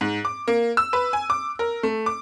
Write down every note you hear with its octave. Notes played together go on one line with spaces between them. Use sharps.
G#2
D6
A#3
E6
B4
G#5
D6
A#4
A3
D6